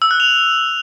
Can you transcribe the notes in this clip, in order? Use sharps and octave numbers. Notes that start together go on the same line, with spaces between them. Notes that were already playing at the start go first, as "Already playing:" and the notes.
E6
F#6
F7